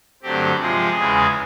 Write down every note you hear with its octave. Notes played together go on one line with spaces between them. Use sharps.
G2 D3 F#3 A3 C4 G4
C3 F3 G#3 G#4
E2 C#3 E3 G#3